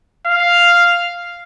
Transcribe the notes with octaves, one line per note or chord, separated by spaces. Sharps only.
F5